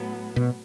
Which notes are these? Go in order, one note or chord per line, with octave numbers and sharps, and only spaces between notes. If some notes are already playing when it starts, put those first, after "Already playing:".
Already playing: A2 F#3 B3
B2